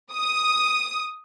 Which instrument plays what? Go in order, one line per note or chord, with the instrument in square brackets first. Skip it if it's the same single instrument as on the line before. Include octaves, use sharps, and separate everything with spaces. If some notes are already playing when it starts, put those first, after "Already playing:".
[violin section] D#6